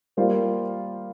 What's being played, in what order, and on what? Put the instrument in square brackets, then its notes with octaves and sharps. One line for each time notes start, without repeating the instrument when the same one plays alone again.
[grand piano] G3 A#3 F4 C5